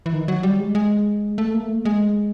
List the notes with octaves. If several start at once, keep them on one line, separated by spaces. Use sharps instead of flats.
E3
D#3
F#3
G3
G#3
G#3
A3
A#3
A3
G#3